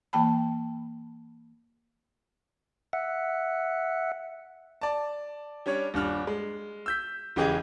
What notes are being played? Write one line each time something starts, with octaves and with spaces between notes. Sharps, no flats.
E3 A#3 G5 A5 B5
E5 F#5
D5 A5
G3 C#4 D4 C#5
D#1 G2 D4 F6
G#3
E6 G6 B6
E1 C#3 E3 G4 G#4 D#5